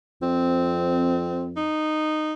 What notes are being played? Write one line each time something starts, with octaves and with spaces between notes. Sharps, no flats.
F2 C4
D#4